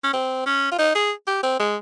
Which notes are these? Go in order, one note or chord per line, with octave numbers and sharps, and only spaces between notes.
C#4
C4
C#4
F4
D#4
G#4
G4
C4
G#3